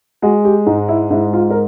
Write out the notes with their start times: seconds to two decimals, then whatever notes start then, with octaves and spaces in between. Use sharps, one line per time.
0.22 G#3 F#4
0.45 G4
0.66 G#2 D#4
0.88 E4
1.10 G#2 E4
1.33 F4
1.50 A#4